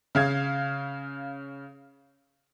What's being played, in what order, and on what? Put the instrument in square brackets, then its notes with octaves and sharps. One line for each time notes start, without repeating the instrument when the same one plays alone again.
[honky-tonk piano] C#3 F5 G#6